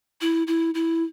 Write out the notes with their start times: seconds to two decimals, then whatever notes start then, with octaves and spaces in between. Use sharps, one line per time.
0.21 E4
0.47 E4
0.74 E4